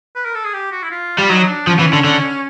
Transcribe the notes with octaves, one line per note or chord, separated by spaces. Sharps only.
B4
A#4
A4
G#4
G4
F#4
E4
F4
G3
F#3 D#4
D4
F3 C#4
E3
D3
D3